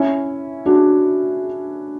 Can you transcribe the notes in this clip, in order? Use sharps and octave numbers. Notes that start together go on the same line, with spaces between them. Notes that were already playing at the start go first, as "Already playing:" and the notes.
Already playing: C#4 E4
D4 F#4